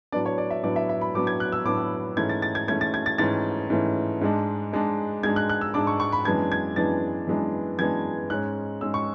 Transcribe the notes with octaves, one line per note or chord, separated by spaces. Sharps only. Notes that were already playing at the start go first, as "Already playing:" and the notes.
A2 F#3 B3 D4 D5
C#5
D5
E5
A2 F#3 B3 D4 D5
E5
E5
B5
A2 F#3 B3 D4 D6
G#6
F#6
E6
A2 F#3 B3 D4 D6
G#2 E3 A3 C#4 G#6
A6
A6
G#6
G#2 E3 A3 C#4 G#6
A6
G#6
A6
G#2 E3 A3 C#4 A6
G#2 E3 A3 C#4
G#2 G#3 D4
G#2 G#3 D4
G#2 G#3 D4 G#6
F#6
F#6
E6
G#2 G#3 D4 D6
C#6
C#6
B5
F#2 E3 G#3 B3 D4 G#6
G#6
F#2 E3 G#3 B3 D4 A6
F#2 E3 G#3 B3 D4
F#2 E3 G#3 B3 D4 G#6
G#2 G#3 C#4 F#6
G#2 G#3 C#4 E6
C#6